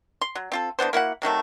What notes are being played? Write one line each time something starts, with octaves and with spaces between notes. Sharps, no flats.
C6
F#3
C4 F4 A4
D3 E3 B3 C5
A#3 E4 F#4 F#5
C3 D#3 F#3 A3